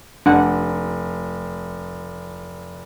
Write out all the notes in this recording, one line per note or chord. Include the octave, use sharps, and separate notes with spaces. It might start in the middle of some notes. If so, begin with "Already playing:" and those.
F1 D4 F#5